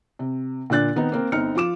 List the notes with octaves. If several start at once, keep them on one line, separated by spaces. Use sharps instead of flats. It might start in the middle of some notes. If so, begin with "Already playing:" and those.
C3
A#2 D3 D4 F#6 A6
D#3 B3 C4 D#4
A#3 C4 A#4
G1 C4 D#4 F6 C#7
F3 F4 D6 E7